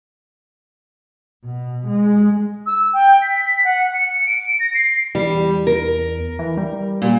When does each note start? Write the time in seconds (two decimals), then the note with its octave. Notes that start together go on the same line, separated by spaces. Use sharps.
1.45 B2
1.87 G#3
2.66 E6
2.93 G5
3.22 B6
3.64 F#5
3.94 C#7
4.27 D7
4.60 A#6
4.74 C7
5.15 E2 G3
5.67 A#4
6.39 E3
6.57 G3
7.02 A#2